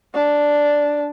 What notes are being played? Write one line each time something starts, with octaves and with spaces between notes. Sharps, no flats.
D4